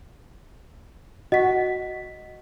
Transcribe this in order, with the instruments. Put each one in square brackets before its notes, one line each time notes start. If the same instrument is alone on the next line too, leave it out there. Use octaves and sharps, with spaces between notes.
[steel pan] F#4 [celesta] D#5 B6